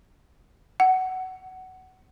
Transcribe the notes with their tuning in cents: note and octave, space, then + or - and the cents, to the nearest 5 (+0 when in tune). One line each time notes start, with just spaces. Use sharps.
F#5 +15